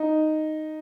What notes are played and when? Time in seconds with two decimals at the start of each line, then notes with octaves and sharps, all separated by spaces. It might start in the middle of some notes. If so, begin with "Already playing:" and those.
Already playing: D#4